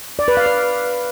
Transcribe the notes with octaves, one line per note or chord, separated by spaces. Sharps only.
D5
B4
F5
D5